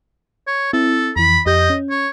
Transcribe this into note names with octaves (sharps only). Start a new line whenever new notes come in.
C#5
C4 E4 A4
F2 E3 B5
F2 G4 D#5 G6
C#4
C#5